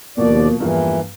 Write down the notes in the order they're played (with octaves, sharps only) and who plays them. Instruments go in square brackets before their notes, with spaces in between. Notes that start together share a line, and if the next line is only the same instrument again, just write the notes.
[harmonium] D#2 D5 [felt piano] B2 F3 [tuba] A#3
[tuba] E2 [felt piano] G2 F3 A#3 [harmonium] E3